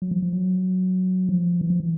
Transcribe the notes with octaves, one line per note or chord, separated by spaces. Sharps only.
F#3
F3
F3
F#3
F3
E3
F3
E3